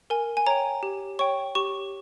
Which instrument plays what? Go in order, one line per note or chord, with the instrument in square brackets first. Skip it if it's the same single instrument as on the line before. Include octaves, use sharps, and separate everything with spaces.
[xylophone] A#4 G#5
G#5
C#5 G5 A#5
G4
C#5 G5 C#6
G4 C#6